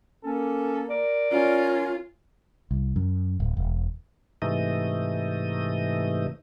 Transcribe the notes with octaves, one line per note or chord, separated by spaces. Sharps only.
A#3 C#4 A4
A#4 D5
C#4 F4 A#4
C2
F#2
D1
E1
G#2 C3 E3 A3 D#4 D#5